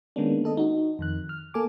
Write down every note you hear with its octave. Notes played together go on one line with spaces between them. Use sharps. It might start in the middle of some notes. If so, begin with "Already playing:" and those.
D#3 G#3 A#3 B3 C#4 D4
B3 A4 D#5
D#4 F#4
F2 D#3 F#6
F6
A#3 A4 G#5 D6